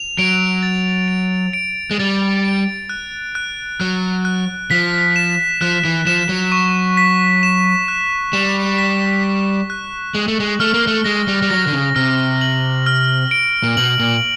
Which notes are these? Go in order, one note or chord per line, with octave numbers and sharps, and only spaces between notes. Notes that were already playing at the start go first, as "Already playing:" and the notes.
Already playing: F7
F#3 D7
A6
D7
D7
G#3
G3 A6
D7
F#6
F#6
F#3 F#6
F#6
F3 B6
E7
F3 F#6
E3
F3 E7
F#3
C#6
B6
E7
F#6
G3 E7
B6
B6
F#6
G#3 F#7
A3
G#3
A3 F6
A#3
A3
G#3 A#6
G3
G3
F#3 A#6
D3
C#3
C3 F6
F#7
F6
D7
A#2
B2 F#7
A#2